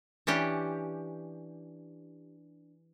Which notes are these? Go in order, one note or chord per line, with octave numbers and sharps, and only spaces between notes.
E3 C#4 D4 G4